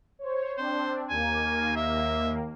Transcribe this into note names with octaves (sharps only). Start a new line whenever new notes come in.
C5 C#5
C4 D4 C5
D#2 A#3 G#5
E5